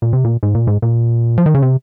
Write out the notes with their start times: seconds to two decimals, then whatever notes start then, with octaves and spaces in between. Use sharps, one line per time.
0.02 A#2
0.13 C3
0.25 A#2
0.43 G#2
0.55 A#2
0.67 G#2
0.82 A#2
1.38 F3
1.46 D#3
1.55 C#3
1.62 C3